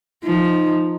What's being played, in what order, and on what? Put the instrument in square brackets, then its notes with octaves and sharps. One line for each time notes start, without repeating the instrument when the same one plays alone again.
[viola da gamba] F3 [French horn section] D#4